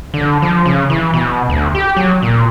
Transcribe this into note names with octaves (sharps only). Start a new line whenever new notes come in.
D3
F3
C#3
E3
B2
D2
G4
F#3
A#2